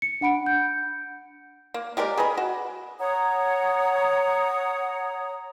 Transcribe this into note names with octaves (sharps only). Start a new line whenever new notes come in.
C#7
D4 F#5 B5 D7
G6
A#3
G#3 G4 A#4 D5
G#4 B4 D#5 B5
F#4
C#5 F#5 A#5 D#6